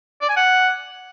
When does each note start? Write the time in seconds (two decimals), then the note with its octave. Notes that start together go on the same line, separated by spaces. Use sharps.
0.21 D5
0.29 G#5
0.36 F#5